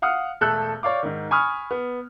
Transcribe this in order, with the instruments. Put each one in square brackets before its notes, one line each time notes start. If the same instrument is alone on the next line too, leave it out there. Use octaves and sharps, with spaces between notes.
[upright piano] F5 F#5 D#6 F6
E1 A3 A4 E6 F#6 G6
C#5 D5 F5 D6
G#2 D#3
G#5 B5 C#6 D#6 F6
B3